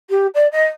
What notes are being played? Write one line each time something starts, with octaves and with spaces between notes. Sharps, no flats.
G4
D5
D#5